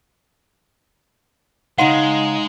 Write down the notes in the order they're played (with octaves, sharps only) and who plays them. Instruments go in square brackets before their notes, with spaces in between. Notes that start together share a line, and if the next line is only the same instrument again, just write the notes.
[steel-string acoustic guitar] C#3 F5 [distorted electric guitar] G#3 [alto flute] D#4 [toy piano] F#5 C6